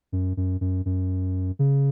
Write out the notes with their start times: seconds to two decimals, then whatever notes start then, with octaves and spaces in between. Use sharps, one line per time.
0.12 F#2
0.37 F#2
0.61 F#2
0.85 F#2
1.59 C#3